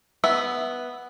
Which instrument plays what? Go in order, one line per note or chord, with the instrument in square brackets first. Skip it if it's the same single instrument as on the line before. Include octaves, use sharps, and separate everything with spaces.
[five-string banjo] B3 E5